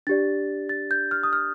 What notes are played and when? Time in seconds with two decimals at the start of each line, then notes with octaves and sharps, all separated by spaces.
0.07 D4 G4 D5 A6
0.69 A6
0.91 G6
1.11 F6
1.23 D#6
1.33 F6